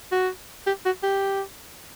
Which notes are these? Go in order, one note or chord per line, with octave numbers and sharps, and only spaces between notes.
F#4
G4
F#4
G4